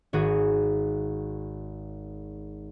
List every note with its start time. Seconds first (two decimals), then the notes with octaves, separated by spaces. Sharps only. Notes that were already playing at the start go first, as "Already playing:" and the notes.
0.13 G#1 F#4 G#4